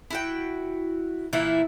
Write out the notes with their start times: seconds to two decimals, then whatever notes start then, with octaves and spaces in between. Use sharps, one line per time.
0.10 E4 F#4 G5
1.33 A#2 E3 A#3 E4